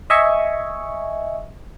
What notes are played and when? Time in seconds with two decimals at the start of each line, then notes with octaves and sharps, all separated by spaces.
0.10 D#5 E5 G#5 C#6